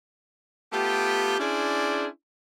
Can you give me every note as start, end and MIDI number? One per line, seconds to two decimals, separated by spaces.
0.73 1.37 57
0.73 1.37 59
0.73 1.37 65
0.73 1.37 67
1.40 2.07 61
1.40 2.07 62
1.40 2.07 64
1.40 2.07 68
1.40 2.07 72
1.40 2.07 74